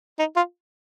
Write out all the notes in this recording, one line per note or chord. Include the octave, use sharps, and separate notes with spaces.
D#4
F4